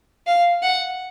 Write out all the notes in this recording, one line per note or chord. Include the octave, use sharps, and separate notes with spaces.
F5
F#5